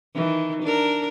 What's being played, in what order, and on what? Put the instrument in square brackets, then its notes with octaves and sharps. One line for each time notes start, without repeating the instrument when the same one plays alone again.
[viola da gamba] D#3 E3
D4 A#4